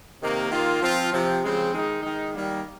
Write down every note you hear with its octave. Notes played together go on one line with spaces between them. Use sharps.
C3 D#3 A#3
D#3 A#3 F4
F3 C4 F4
C3 F3 C4
C#3 F3 G#3 C4
D#3 G#3 D#4
D#3 G#3 D#4
D#3 G3 A#3